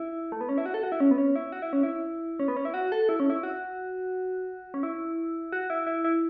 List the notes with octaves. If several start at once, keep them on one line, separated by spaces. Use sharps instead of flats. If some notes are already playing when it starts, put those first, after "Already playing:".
Already playing: E4
A3
B3
C#4
E4
F#4
A4
F#4
E4
C#4
B3
C#4
E4
F#4
E4
C#4
E4
C#4
B3
C#4
E4
F#4
A4
E4
C#4
E4
F#4
C#4
E4
F#4
E4
E4
E4